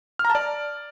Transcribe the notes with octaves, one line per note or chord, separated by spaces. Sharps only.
F6
A#5
A5
D5